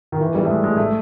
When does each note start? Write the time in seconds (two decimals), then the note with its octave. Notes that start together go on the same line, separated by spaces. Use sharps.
0.12 D#3
0.20 E3
0.35 G3
0.45 A3
0.49 G#3
0.64 G#3
0.77 A3